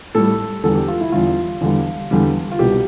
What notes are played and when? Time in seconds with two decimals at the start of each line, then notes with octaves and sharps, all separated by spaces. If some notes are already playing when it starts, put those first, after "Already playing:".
0.15 A2 G3 A4
0.63 E2 D3 G3 A4
0.75 G4
0.88 F4
1.01 E4
1.12 E2 D3 G3 F4
1.61 E2 D3 G3
2.11 E2 D3 G3
2.52 F4
2.59 C2 B2 G3 G4